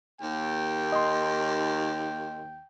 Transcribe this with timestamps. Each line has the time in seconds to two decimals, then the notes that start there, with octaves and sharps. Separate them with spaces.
0.21 D#2 G5
0.92 D#5 C6